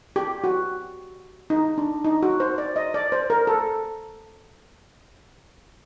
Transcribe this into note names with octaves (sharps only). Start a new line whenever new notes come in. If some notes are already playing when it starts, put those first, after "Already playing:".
G4
F#4
D#4
D4
D#4
F#4
C5
D5
D#5
D5
C5
A#4
A4